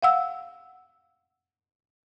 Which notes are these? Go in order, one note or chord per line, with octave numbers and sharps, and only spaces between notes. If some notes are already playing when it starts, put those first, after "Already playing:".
F5 F#5 E6